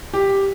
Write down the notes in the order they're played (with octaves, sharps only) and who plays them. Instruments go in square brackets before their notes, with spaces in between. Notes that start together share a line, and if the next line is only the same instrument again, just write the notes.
[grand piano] G4